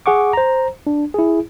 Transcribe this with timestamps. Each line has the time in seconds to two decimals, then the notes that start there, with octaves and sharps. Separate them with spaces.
0.06 G#4 F#5 C#6 D6
0.33 C5 A#5
0.87 D4
1.14 E4 G#4